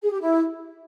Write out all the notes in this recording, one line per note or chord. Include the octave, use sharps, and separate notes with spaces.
G#4
G4
E4